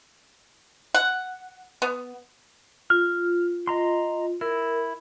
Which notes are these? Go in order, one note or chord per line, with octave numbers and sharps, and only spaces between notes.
F#5
B3
F4 F6
D#5 A#5 C6
E4 A#4